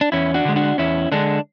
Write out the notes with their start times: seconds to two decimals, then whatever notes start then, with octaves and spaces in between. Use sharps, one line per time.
0.01 D4
0.12 E2 C#4 E4
0.34 D4 F#4
0.45 D3 G#3
0.56 D4 F#4
0.78 E2 C#4 E4
1.12 D3 G#3 D4